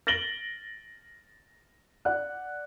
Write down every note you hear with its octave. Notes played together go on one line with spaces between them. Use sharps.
A6 A#6 D7 F#7 G7
D5 F#5 F#6